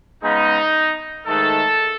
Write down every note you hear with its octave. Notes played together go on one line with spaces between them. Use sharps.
C#3 G#3 B3 D#4
G#2 D#3 A3 A4